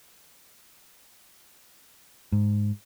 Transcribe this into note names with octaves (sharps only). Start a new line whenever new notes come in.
G#2